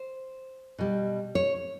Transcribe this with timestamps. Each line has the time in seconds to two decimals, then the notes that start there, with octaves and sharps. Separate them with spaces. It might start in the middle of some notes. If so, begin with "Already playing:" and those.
Already playing: C5
0.78 B2 G3
1.35 C#5